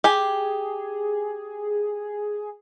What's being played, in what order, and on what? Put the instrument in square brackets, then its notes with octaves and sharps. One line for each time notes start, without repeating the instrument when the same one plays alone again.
[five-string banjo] G4 G#5 [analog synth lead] G#4